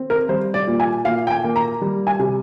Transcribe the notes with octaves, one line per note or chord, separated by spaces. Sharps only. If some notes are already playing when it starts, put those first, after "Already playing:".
Already playing: C4
A#4
G3 C5
D5
A#2
G#5
A#2 F5
G5
G#5
A#3
A#5
G3
G#5
C3